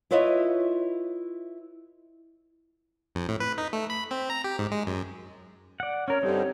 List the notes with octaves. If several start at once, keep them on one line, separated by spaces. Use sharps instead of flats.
E4 F4 B4 C#5 D#5 E5
F2
A2
B4
D#4
A3
B5
C4
A#5
G4
G#2
G#3
F#2
D5 F#5
C#4 A#4 C#5
G2 D3 G3 C4 D#4